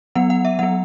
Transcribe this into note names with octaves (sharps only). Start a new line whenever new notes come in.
F#3 B3 F#5
F#5
E5
F#3 B3 F#5